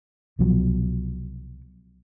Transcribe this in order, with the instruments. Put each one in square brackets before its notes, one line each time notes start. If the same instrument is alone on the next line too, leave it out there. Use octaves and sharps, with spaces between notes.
[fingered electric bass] C2 B2 F3 F#3